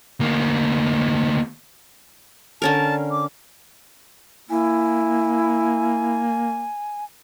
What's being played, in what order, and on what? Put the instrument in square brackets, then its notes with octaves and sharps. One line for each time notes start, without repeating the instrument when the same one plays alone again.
[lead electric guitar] D2 A#3
[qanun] D3 C#4 A#4 [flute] A5
[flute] D6
[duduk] A#3 [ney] E4 [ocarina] G#5